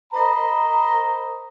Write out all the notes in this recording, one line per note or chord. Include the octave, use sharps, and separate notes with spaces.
A#4 C5 D#5 A#5 B5